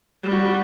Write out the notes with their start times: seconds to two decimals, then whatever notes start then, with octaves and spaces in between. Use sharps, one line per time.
0.23 G3
0.32 F#4
0.48 F#4